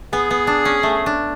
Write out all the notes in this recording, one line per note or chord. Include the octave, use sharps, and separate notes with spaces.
B3 G#4
B3
D4
C#4
A3
D4